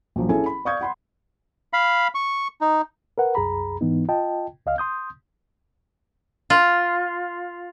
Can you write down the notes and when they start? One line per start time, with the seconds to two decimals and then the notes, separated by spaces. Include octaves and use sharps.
0.16 A#1 F3 F#3
0.29 C#4 E4 G#4 A4 G#5
0.46 B5
0.65 D5 F5 C#6 D#6 G6 G#6
0.81 F#5 B5 C6
1.73 F5 B5
2.15 C#6
2.61 D#4
3.18 A#4 B4 F#5
3.35 C2 F#2 G#4 A#5 B5
3.81 G#2 E3 B3 D#4
4.08 F4 D#5 G5 A5
4.66 C#2 D#5 F5 F6
4.78 C6 D#6 G6
6.50 F4